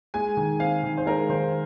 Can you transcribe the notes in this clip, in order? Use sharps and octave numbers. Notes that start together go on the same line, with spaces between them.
G#3 G#5
D#3
C4 F5
D#3
C5
G#3 A#4
D#3 C5